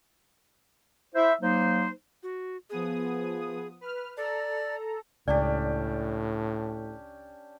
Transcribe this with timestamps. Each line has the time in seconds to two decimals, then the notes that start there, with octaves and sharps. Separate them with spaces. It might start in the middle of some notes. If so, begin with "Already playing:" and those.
1.15 E4 C5 E5
1.41 F#3 A#3 D#4 C5
2.23 F#4
2.70 F3 B3 G#4 D#6
3.81 B4 F6
4.17 A4 D5 A#5
5.28 C#2 A2 C#4 D4 G4 D5